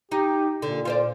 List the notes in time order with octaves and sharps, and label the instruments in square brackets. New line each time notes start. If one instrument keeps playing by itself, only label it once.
[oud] D#4 [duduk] G4
[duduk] A#2 [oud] D3
[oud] F4 C5 D5